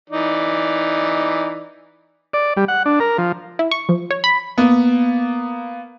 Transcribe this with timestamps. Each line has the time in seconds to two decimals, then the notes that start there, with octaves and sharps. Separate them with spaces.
0.10 E3 D#4 D5
2.33 D5
2.57 G3
2.68 F#5
2.86 D4
3.00 A#4
3.18 F3
3.59 E4
3.71 C#6
3.89 F3
4.11 C#5
4.24 B5
4.58 A#3 B3